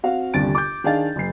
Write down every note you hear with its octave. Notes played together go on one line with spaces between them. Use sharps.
C4 F#4 F5
G1 D#2 C3 D4 A6 D7
D6 G6
D#3 D4 G#4 D#5 F5 A6
F#1 C7